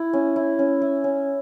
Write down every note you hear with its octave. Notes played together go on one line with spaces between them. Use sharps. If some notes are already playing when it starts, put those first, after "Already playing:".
Already playing: E4
C#4
E4
C#4
E4
C#4